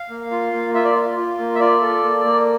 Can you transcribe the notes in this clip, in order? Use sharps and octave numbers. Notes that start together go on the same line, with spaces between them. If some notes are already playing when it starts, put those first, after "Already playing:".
Already playing: F5
A#3
F4
A#3
F4 E5
D5
F4
F4
A#3
E5
F4 D5
A4
A#3
A#3